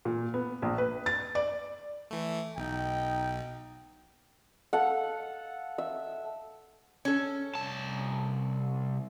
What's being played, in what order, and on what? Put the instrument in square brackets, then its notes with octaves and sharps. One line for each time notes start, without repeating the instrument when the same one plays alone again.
[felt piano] A#2
B3
A#1
B4
A6
D5
[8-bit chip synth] E3 A3
[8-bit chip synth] B1 [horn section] D#4 G5
[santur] A4 F5 F#5
E5
[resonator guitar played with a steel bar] C#4 A4
[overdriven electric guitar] C2 A5